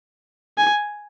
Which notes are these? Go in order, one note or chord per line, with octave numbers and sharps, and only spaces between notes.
G#5